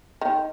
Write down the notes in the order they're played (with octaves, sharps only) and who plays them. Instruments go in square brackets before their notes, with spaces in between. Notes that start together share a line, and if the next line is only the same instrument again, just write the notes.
[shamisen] D#3